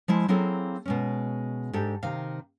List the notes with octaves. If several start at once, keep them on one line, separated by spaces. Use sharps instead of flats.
F3 G#3 E4
F#3 A#3 C4 E4 G#4 A4
B2 G#3 C#4
G#2 D4 G4 A4
C3 D#3 F5